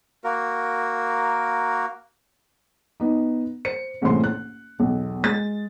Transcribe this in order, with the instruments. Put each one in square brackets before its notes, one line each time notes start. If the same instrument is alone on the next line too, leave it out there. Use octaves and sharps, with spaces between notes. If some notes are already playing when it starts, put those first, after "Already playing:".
[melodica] A#3 F#4 A#4
[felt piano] B3 D#4
C5 C#7
F#1 C2 A2 E3 C5 C6
F#6
B1 E2
G#3 A6